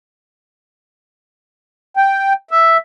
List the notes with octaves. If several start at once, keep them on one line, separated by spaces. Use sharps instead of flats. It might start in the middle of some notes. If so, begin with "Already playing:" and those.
G5
E5